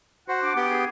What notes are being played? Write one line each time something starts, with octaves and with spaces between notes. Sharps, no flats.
F#4 C5 F#5
D4 F#5 D6
B3 G4 G5
G#4